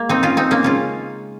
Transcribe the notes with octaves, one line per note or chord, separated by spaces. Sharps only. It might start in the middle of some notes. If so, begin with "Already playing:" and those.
Already playing: G#3 A#3
C4 D#4
C#4 F4
C4 D#4
A#3 C#4
C#3 G#3 C#4 F4